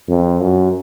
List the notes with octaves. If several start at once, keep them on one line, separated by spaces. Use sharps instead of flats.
F2
F#2